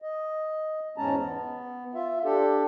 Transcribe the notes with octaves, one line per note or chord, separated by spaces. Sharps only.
D#5
E2 G#2 G#3 C#4 A5 A#5
B3
F4 E5
D4 G4 A4